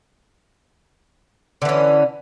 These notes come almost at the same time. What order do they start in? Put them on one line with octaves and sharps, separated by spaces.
D3 E3 C#4